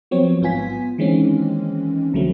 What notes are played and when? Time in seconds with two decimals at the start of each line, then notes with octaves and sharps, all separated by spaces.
0.11 F3 F#3 B3 C4 C#5
0.41 A1 G#2 B3 F4 G#5 B6
0.98 D#3 E3 G#3 A#3 C4 C#4
2.13 C2 D3 F3 F#3 A3